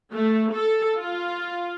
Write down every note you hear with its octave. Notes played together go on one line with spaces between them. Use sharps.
A3
A4
F4